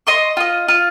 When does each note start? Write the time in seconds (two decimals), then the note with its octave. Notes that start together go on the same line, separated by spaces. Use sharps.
0.07 D#5 C6 C#6
0.37 F4 D#5
0.69 F4